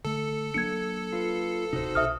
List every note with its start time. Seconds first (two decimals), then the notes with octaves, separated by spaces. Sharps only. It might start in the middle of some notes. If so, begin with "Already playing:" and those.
0.05 D3 A3 A4
0.54 F#3 A#3 D4 G#6 C#7
1.13 F4 B4
1.73 D1 C3 D#4 F#4 C5
1.95 B1 E5 D#6 F6